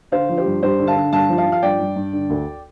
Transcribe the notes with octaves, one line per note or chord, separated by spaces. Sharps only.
D3 C5 F5
F3
G4 C5
G2
G2 G4 C5
D3
F5 A5
D3
G2 F5 A5
F3
F5 A5
F3
F5
G2 D5 G5
G2
G2
D3
D2